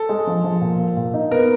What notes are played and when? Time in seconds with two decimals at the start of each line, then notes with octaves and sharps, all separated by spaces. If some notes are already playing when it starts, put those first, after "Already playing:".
Already playing: A4
0.09 G#3
0.27 F3
0.44 F3
0.61 A#2
0.79 A#2
0.97 A#2
1.14 D#4
1.31 B3 A#4